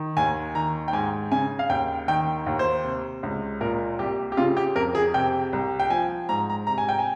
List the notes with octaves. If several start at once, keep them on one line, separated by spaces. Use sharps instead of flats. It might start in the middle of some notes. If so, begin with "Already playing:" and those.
Already playing: D#3
D#2 G#5
D#3 A#5
G5
G#2 G#5
C#3 G#5
F5
D#2 G5
D#3 G5
D#2
C5
C3
C#2
A#2 A#4
C2 G4
G4
C#3 F4
G4
F2 A#4
G#4
C3 G5
C2
G5
F3 G#5
G#2 A#5
A#5
C3 A#5
G#5
G5
G#5